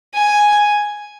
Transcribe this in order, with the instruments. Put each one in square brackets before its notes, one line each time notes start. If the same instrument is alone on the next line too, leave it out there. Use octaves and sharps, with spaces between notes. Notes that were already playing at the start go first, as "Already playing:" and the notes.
[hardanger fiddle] G#5